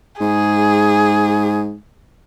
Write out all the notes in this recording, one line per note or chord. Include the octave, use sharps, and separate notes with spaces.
G#2 G#4